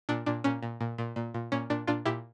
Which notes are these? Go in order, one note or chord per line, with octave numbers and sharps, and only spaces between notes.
A#2 D4
A#2 D4
A#2 C#4
A#2
A#2
A#2
A#2
A#2
A#2 C#4
A#2 D4
A#2 D4 F4
A#2 E4 G4